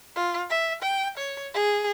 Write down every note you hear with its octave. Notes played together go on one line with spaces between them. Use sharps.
F4
E5
G5
C#5
G#4